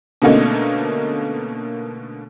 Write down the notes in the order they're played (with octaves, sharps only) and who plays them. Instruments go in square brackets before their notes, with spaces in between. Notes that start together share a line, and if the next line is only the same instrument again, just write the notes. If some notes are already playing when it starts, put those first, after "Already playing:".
[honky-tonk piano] B2 D3 A3 A#3 C#4 D#4